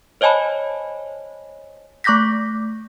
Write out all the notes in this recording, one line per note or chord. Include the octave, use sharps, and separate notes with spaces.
C5 C#5 D#5 G#5 A5 B5
A3 C#6 D6 G6 A#6 B6